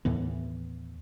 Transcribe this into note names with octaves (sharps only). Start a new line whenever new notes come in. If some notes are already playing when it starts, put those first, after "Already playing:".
D#2 A2 E3 B3